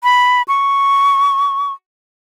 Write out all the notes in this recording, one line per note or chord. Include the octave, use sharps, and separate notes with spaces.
B5
C#6